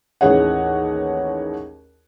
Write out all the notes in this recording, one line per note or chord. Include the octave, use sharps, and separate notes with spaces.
A1 D#2 E3 G#4 C#5 F#5